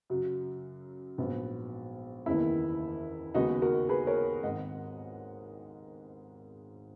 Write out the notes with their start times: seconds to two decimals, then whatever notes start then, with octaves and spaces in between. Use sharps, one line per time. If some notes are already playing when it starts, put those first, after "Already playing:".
0.10 F#2 C#3 F#3
1.18 A#1 G#2 F#3 B3
2.26 F#1 E2 D#3 A#3 E4
3.35 D#2 C#3 G#3 B3 D#4 F#4
3.62 F#4 A#4
3.89 G#4 B4
4.07 A#4 C#5
4.43 G#1 G#2 D#3 D#5 F#5